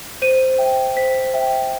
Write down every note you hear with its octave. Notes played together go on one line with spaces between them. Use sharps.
C5 D#7
E5 G5
C5 B6
E5 G5